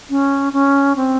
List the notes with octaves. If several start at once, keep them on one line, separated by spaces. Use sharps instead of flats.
C#4
C#4
C4